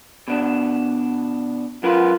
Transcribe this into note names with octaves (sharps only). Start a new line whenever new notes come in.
B2 D4
F#2 F4 A#4 B4